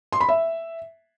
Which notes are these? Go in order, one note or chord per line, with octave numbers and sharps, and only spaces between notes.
C6
B5
E5